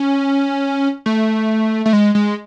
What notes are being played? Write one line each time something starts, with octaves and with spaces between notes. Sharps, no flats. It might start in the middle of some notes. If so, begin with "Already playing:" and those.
Already playing: C#4
A3
A3
G#3
G#3